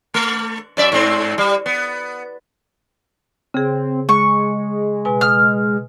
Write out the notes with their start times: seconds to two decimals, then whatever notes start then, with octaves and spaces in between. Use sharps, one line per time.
0.14 A3
0.77 F#2 D5 E5
0.92 G#2 C4
1.38 G3
1.66 B3
3.54 C#3 C4 G#4
4.09 G#3 C#6
5.05 B2 B4 G#5
5.21 D#6 F6